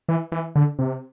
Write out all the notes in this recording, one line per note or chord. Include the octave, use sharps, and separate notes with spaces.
E3
E3
D3
C3